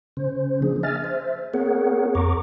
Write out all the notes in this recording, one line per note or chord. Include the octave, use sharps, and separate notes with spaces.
C#3 C#4 C5
F3 A#3 D4 G#4
D#5 E5 G#5 F6 A6
C5 E5
A#3 C4 G#4 A#4 C#5 F#5
F2 A#5 C#6 D6